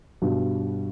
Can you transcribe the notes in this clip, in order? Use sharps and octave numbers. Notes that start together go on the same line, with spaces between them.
G2 B2